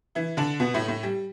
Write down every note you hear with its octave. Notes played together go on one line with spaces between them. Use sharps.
E3 E4
D3 D4
B2 B3
A2 A3
A2 A3
G3